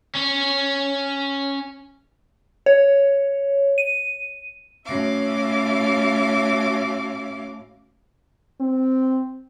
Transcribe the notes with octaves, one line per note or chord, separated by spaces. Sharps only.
C#4 C#5
C#5
D#7
A2 C#4 F#4 E5 F5 D6
C4